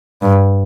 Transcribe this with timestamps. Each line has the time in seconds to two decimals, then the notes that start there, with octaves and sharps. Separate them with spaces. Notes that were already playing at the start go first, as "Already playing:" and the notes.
0.22 G2